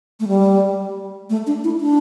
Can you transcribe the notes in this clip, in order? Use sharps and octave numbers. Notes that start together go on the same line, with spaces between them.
A3
G3
A3
D4
E4
D4